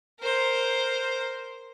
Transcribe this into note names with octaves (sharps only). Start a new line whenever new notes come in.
A#4 C5